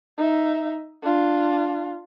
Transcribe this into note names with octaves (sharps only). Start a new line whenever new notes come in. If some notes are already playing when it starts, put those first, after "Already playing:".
D#4 E5
D4 F4